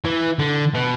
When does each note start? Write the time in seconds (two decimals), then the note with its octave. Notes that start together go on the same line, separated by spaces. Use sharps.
0.05 E3
0.39 D3
0.74 B2